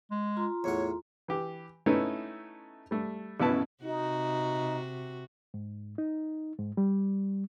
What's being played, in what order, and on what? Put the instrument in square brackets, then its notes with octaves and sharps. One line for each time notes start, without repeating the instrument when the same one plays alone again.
[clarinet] G#3
[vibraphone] F4 A#5 C6
[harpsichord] E2 A2 F#5 [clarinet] C#5
[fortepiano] E3 G4
A3 B3 C#4 D#4 E4 A4
G3 A3
A1 F#2 B2 E4 B4 A5
[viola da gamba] C3 F#4 [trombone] D#4
[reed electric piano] G#2
D#4
G#2
G3